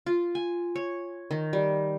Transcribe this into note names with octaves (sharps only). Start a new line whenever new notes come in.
F4
G#5
C#5
D#3
G3